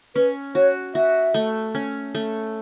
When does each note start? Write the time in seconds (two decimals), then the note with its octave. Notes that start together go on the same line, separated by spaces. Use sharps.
0.16 C#4 B4
0.55 F#4 C#5
0.95 F#4 E5
1.34 A3
1.75 C#4
2.15 A3